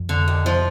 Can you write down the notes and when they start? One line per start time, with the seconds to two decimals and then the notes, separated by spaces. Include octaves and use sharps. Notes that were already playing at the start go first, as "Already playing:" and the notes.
Already playing: F2
0.09 D3
0.28 D#2
0.46 F3